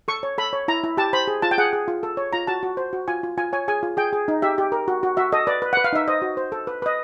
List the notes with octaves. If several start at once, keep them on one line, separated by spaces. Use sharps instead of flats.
A4 C#6
C#5
A4 B5
C#5
E4 A#5
E4
G4 A5
C5 B5
G#4
F4 A5
G5
G#4 F#5
G#4
F4
A4
C#5
F4 A#5
F#4 A5
F#4
C5
F#4
F4 G#5
F4
F4 G#5
C#5 G#5
G#4 G#5
F4
G#4 G5
G#4
D#4
G4 E5
G4
A#4
F#4
F#4
F#4 E5
A4 D#5
B4 D5
B4
B4 F#5
F5
D#4 E5
C5 D#5
F#4
C5
A4
B4
B4 D#5